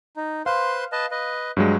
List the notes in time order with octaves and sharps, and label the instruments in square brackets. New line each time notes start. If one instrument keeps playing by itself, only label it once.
[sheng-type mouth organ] D#4
[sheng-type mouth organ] B4 C5 C6 [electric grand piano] F5
[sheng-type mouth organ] B4 D#5 A5
B4 D#5
[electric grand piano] G2 F#3 G#3